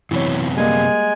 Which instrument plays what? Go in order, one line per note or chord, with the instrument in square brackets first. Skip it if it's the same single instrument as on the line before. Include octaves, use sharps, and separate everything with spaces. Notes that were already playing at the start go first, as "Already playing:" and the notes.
[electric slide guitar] F#2 C3 B3 [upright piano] E3 C#5
[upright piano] G3 A#3 [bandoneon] G#3 G#5